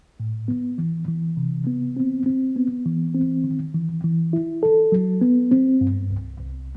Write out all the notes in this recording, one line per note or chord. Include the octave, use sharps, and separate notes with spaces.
A2
B3
E3
E3
C3
B3
C4
C4
B3
E3
C4
D#3
E3
E3
E4
A4
F#3
B3
C4
G2
C2
C2